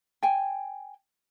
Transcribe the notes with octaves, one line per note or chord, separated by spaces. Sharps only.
G5 G#5